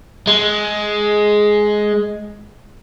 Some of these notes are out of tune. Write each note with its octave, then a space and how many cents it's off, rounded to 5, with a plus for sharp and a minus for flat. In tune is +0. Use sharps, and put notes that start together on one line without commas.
G#3 +10